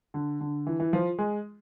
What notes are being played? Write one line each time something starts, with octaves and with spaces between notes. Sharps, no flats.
D3
D3
E3
E3
F3
G#3